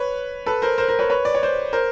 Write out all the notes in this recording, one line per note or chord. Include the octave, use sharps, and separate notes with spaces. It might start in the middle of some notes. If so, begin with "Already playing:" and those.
Already playing: B4 C#5
A4 B4
A#4 C5
A#4 C5
A#4 C5
B4 C#5
B4 C#5
D5
C#5
C5 D5
A#4 C5